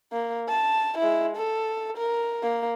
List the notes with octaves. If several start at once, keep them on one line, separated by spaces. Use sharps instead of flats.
A#3
A5
G#3 E4
A4
A#4
A#3